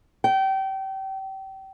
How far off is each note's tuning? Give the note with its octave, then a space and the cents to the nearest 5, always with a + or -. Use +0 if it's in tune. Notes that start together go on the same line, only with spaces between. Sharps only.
G5 -30